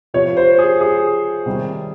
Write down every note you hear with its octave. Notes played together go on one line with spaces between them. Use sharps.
C3 F3 C#5
C5
G#4
G#4
C3 D#3 G3